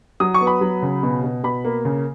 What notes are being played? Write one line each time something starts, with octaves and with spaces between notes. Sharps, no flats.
F#3 D#6
C#6
B3
B5
F#3
C#3
B2
B2
B2 B5
A#3
C#3